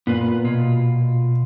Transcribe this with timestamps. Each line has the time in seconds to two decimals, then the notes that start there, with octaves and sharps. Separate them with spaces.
0.07 A#2 B3 F4 B4
0.44 B2 F4